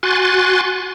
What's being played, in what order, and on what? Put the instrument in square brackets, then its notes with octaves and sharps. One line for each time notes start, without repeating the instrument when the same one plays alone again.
[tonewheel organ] F#4 G#5 C6 F#6 A6